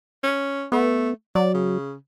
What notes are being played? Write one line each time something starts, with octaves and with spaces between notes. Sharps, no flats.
C#4
A3 B3
F#3 D5
C#3